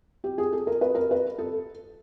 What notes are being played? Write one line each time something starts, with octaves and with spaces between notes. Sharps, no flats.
G4
G#4
A4
A#4
B4
A#4
B4
A4